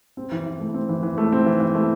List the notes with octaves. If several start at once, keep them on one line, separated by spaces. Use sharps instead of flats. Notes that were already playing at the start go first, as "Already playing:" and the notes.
C4
E3
E3
A3
C4
E3
E3
A3
C4
E3
E3
A3